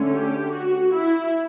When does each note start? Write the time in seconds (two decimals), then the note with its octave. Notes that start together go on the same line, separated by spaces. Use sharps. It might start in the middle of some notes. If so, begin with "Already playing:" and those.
Already playing: D3 A3 C#4
0.13 G4
0.53 F#4
0.93 E4